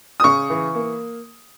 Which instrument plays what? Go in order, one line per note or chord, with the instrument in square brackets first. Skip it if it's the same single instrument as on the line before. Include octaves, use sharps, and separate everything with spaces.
[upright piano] D#6
C#3 C#6
E3
A#3